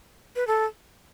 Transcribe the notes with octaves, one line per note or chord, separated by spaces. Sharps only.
B4
A4